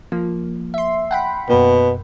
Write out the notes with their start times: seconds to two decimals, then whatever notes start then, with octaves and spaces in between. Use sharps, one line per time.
0.12 F3 A#3
0.74 E5 C6
1.11 F#5 G5 B5
1.50 F#2 B2 A#3